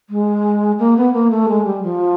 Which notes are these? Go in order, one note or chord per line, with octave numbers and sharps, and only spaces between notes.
G#3
A#3
B3
A#3
A3
G#3
G3
F3